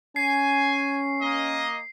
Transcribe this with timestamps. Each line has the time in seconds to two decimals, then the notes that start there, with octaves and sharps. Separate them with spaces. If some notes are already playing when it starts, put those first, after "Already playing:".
0.16 C#4 G#5 C7
1.22 A#3 D#5